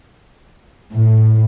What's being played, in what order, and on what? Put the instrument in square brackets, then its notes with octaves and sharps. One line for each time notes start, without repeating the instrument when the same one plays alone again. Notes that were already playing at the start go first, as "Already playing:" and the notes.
[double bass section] A2